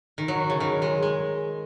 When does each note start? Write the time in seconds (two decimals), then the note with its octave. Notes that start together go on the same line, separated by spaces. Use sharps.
0.18 D#3
0.28 F#3
0.50 C#3
0.60 D#3
0.82 G#3
1.03 G#3